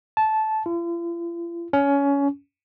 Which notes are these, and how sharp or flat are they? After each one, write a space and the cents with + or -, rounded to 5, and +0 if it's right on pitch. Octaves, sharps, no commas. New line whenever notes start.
A5 -15
F4 -45
C#4 +20